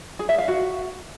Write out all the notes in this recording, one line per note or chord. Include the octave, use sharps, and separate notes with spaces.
G#4
E5
F5
F#4